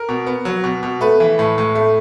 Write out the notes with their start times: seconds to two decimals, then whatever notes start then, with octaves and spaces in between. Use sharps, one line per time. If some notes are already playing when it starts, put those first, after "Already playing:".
Already playing: A#4
0.09 B2
0.26 B3
0.45 F#3
0.64 B2
0.83 B2
1.01 A3 B4
1.20 E3
1.39 A2
1.58 A2
1.75 A3